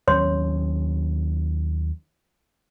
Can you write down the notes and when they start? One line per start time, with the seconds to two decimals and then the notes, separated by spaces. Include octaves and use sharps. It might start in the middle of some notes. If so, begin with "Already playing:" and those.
0.08 D#2 F#3 C#4 C#5 C6